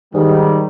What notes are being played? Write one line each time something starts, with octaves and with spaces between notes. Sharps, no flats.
G#2 D#3 G3